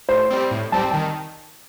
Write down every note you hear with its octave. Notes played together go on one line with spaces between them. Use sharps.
A2 C5
G3 C4
A2
G3 C4 A5
G5
D#3 A5